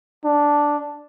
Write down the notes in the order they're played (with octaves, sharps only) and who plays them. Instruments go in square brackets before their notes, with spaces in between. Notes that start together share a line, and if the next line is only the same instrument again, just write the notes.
[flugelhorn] D4